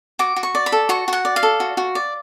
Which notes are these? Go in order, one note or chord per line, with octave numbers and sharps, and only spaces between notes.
F#4 D6
F#4
C#6
D5
B5
A4
F#4 C#6
F#4 F#5
D5
F5
A4
F#4
F#4
D5